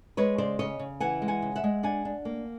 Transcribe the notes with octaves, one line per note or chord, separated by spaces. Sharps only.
G#3 B4 C#5
C#3 C5 D5
C#3 C#5 D#5
C#3
E3 F#5 G#5
G#3
F#5 G#5
C#3
E5 F#5
G#3
D4 F#5 G#5
D4
A#3